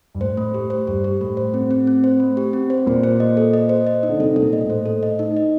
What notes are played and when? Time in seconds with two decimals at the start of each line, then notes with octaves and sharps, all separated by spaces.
0.15 G2
0.21 A2 C5
0.37 A3
0.54 G4
0.70 C5
0.87 G2 G4
1.04 G4
1.21 A2 A3
1.37 C5
1.54 C4
1.71 C4
1.87 C4
2.04 C5
2.20 A3
2.37 G4
2.53 C4
2.70 C5
2.86 A#2 C5
3.03 C5
3.20 D#5
3.37 A4
3.54 D#5
3.69 C5
3.87 D#5
4.03 D#4
4.09 D3
4.19 C3 A4
4.36 C3 A4
4.42 A#2
4.53 D#5
4.64 A2
4.70 C5
4.86 A4
5.03 D#5
5.19 D#4
5.37 D#5